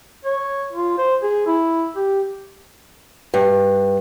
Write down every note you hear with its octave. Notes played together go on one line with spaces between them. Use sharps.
C#5
F4
C5
G#4
E4
G4
G2